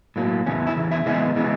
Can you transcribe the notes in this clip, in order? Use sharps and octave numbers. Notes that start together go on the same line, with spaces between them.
A2 F#3 A#3
E2 C#3 E3 C#4
E4
E2 C#3 E3
E4
C#3 E3 G#3 B3 E4
C#3 E3 G#3 B3